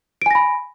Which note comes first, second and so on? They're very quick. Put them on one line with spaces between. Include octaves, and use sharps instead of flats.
D7 G#5 A#6 B5